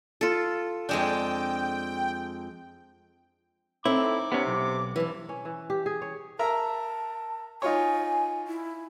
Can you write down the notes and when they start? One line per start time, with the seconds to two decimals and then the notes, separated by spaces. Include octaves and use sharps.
0.21 F4 A4
0.89 F2 G#3 D4 G5
3.85 A2 C4 D#4 E4 D6
4.32 C3 B3 C#4
4.47 B1
4.96 G2 E3
5.29 C#4
5.45 E3
5.70 G4
5.86 G#4
6.02 C#5
6.39 A#4 E5 A5 A#5
7.62 D#4 F4 C#5 G#5
8.48 E4